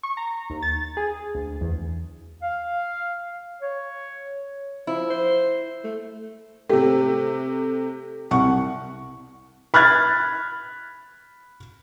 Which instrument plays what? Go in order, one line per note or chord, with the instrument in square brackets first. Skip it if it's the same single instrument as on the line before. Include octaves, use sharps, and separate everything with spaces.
[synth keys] C#6
A#5
D#2
A6
G#4
D2
E2
[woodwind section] F5
C#5
[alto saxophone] F3 [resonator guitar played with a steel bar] E4
[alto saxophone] C5
A3
[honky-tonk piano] C3 A3 [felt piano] G4
[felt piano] C2 C#6 [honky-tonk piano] F#5
[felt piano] B5 F6 F#6 G#6 A6